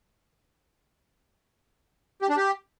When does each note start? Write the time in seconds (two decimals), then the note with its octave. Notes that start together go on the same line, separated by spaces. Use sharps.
2.22 G4
2.29 D4
2.37 G4